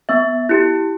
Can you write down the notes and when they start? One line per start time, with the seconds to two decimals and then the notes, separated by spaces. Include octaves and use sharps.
0.09 B3 E5
0.49 E4 G4